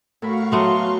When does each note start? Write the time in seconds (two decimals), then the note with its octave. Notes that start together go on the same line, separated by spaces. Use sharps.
0.22 A2 F#4 A#4 F5 B5 C#6
0.52 F#3 A3 B3 C6